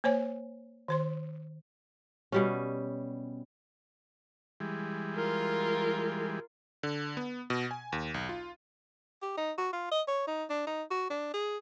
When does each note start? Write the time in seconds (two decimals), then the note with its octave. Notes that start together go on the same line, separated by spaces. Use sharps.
0.04 A#3 C5 C#5 G#5
0.88 D#3 C5 C6
2.32 B2 G3 C#4
4.60 E3 G3 G#3
5.16 F4 A#4
6.83 D3
7.17 B3
7.50 B2
7.71 G#5
7.92 D#2
8.14 B1
8.29 F4
9.22 G4
9.38 D#4
9.58 F#4
9.73 F4
9.92 D#5
10.08 C#5
10.28 D#4
10.50 D4
10.67 D#4
10.91 F#4
11.10 D4
11.34 G#4